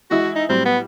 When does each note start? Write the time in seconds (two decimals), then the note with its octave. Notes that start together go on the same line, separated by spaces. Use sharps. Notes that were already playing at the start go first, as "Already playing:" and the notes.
0.11 E3 G#3 E4 F#4
0.36 D#4
0.49 A2 F#3 G3 C4
0.65 B3